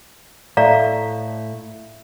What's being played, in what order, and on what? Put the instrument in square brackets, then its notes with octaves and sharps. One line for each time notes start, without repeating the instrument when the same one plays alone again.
[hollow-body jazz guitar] A2 A3 [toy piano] D5 F5 A#5 [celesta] E5